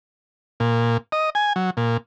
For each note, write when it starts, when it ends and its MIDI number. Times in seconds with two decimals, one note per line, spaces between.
0.60 0.97 46
1.12 1.30 75
1.35 1.53 80
1.56 1.70 54
1.77 1.97 46